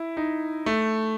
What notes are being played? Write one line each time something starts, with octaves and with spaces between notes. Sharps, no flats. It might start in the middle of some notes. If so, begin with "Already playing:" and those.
Already playing: E4
D#4
A3